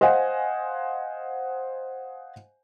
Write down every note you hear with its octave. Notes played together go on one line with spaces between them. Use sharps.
C5 D#5 F5 F#5 G#5